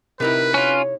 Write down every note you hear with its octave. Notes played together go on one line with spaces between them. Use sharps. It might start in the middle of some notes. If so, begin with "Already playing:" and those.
C3 D#4 E4 A#4 B4
C#4 F4 C#5